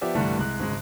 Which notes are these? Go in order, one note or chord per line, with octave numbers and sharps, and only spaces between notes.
F3 B3 G4 D5 E5
C2 G2 D3 E3 G3 A3
C2 G#3 F#6
G#1 C#3 G#3